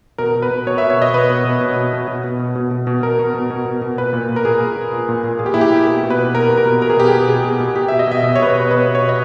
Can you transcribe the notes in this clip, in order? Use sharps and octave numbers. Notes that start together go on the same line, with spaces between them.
B2 A#4
B2
B4
B2
B2 C#5
E5
B2
C#5
B2 D#5
B2 B4
B2
B2
B2
B2
B2
B2
B2
B2
B2
B2
B2
B2 A#4
B2
B2
B2
B2
B2
A#2 B4
A#2
A#2
A#4
A#2 G#4
A#2
A#2
A#2
A#2
A#2
A#2 G#4
G4
A#2 E4
G4
A#2
B2 G4
B2
B4
B2
B2 A#4
B2
A#4
B2
B2 A#4
G#4
B2 G4
G#4
B2
B2 G#4
B2
B2
B2 G4
E5
B2
D#5
B2 E5
B2 D#5
C#5
B2 B4
C#5
B2 B4
B2 B4
B2
C#5
B2
D#5